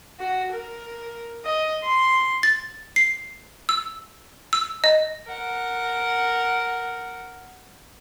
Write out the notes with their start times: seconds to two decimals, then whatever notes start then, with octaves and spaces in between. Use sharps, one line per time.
0.20 F#4
0.52 A#4
1.45 D#5
1.83 C6
2.43 A6
2.96 C7
3.69 E6
4.53 E6
4.84 D#5
5.27 A#4 F#5